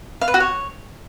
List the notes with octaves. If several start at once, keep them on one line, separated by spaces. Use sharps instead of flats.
F5
B4
F#4
C#5